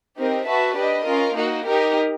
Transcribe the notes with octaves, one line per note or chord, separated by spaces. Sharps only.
C4 D#4 G4 A#4
F#4 B4 E5 A5
D4 G4 B4 D#5
C#4 F4 A#4
A#3 D#4 F#4
D#4 G4 A#4